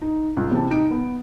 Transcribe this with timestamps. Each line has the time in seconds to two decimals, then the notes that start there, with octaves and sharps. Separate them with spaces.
0.02 D#4
0.37 C#2
0.51 C3 E3 A5
0.70 D#4 D7
0.91 B3